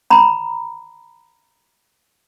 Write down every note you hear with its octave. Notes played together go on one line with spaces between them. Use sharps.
A#5 B5